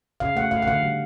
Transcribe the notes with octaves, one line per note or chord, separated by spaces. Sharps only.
C#3 F5
A3 F#5
A3 F5
F#5
D3 F5
G3